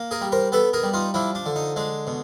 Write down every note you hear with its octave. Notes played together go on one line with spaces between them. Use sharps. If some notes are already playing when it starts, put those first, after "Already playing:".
Already playing: A#3
G#4 A#4
G3
A#4 C5
B3 A4 B4
G#4 A#4
G3
D#4 F4
F3 D4 E4
D4
D3
D#4
G#3 D4
B2